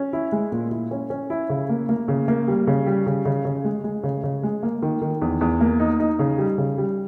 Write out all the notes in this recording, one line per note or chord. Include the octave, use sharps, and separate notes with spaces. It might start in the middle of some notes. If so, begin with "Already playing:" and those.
Already playing: C#4
E4
G#3
A#2
E4
C#4
C#4
E4
C#3
A#3
A#3
C#3
A#3
G3
C#3
G3
C#3
C#3
C#3
G#3
G#3
C#3
C#3
G#3
A#3
D#3
D#3
E2
E2
A#3
D#4
D#4
C#3
G3
C#3
G3